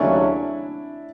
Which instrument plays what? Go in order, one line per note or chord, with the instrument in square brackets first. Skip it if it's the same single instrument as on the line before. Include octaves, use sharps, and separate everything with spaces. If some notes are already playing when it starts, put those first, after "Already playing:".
Already playing: [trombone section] D#2 C#3 F#3 A3 C#4 [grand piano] D4 E4